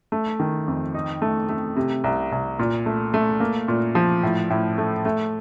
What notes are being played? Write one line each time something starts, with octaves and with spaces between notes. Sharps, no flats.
A3
D#3
F2
D#4
A3
A3
C3
C2
C2
A#2
A3
A3
A#3
A#2
F3
A2
A2
A3
A3